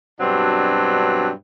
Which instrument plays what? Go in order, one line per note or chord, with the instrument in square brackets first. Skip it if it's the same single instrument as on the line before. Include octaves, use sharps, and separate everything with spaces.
[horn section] G2 B2 F#3 C4 D4